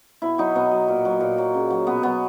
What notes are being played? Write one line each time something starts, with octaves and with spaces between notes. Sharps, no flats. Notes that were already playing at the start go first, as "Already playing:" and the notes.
B2 E4
F#3 D#4
B2 B3
F#3
A#2
F#3
A#2
F#3
C#3
F#3
B2 B3
F#3 B3